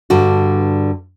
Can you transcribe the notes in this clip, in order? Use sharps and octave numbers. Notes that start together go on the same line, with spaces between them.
G2 D3 F#4